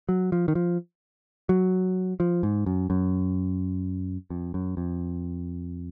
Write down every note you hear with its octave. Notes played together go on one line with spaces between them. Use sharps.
F#3
F3
D#3
F3
F#3
F3
G#2
F#2
F#2
F2
F#2
F2